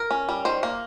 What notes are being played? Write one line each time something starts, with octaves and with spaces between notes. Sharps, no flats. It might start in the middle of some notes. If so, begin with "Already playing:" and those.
Already playing: A#4
C#4
G3
D#3 C5
A#3